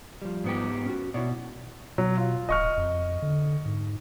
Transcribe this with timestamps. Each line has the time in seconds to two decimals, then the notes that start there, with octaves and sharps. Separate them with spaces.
0.22 F3 G3
0.44 G#2 B3 G4
0.86 C#4 F#4
1.14 B2 E4 C#5 D5
1.98 B2 F#3
2.17 F4
2.49 D1 D#5 C#6 F6
2.77 F2
3.22 D3
3.66 G#2